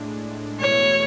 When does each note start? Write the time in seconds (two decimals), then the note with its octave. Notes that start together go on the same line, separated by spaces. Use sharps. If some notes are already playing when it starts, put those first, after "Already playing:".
Already playing: A2 G#3 D4
0.60 E2 B2 A3 E4 C#5